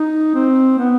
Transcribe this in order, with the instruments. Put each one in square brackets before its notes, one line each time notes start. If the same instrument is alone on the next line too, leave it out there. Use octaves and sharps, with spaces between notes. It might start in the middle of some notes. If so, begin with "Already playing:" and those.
Already playing: [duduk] D#4
C4
B3